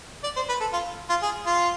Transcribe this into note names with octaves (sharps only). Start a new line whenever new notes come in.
D5
C5
B4
A4
F4
F4
G#4
F4